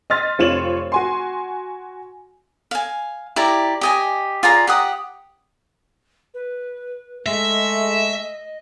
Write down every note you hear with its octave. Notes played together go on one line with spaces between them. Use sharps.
D#5 C6 F6 A6 B6
F1 C4 F4 C#5 E7 F#7
F#4 G#5 C6
F5 G#5
E4 G4 D5 A#5
G4 D#5 G#5
F4 G#4 D5 A#5
G4 F#5 D#6
B4
G#3 A3 D#5 E5